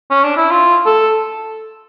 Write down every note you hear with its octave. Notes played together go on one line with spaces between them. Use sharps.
C#4
D4
E4
F4
A4